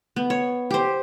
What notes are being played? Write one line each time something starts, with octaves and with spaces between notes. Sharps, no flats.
B3
C#5
G4 C5